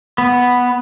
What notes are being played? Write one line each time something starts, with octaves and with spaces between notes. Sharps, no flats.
B3